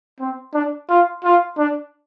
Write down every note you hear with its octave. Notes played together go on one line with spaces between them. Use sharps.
C4
D4
F4
F4
D4